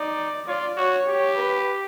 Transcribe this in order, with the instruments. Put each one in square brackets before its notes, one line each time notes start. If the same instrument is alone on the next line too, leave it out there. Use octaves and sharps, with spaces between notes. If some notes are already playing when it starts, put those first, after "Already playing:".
Already playing: [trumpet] D#4 [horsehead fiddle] D5
[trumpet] F4 [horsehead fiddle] D5
[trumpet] F#4 [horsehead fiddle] C#5
[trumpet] G4
[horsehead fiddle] B4